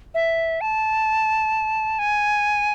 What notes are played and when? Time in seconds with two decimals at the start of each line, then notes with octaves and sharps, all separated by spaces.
0.15 E5
0.61 A5
1.99 G#5